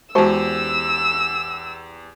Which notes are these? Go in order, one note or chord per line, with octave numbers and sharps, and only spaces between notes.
E2 G#3 F#4 G4 C5 A5 E6